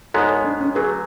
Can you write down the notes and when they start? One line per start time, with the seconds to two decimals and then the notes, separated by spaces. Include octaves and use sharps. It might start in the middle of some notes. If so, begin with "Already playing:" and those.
0.14 G#2 G#3 B3 A4 C#5
0.29 A4 C#5
0.44 D4
0.60 C#4
0.75 D3 F#3 A3 G#4 B4